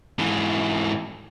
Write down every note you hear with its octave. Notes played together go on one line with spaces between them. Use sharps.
G#2 E3